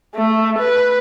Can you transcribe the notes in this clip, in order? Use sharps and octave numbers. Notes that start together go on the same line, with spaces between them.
A3
B4